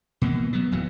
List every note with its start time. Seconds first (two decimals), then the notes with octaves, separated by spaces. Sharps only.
0.22 B2 E3 A#3
0.53 F#3 B3
0.72 D1 E3 F#3